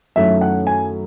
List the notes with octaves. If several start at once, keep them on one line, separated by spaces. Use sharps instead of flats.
F#2 D#3 A3 C#4 E4 E5
F#5
G#5